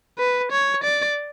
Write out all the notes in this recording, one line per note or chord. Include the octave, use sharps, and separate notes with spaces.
B4
C#5
D5